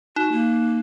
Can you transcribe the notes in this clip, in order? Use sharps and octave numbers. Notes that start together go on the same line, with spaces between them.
D#4 F#4
A#3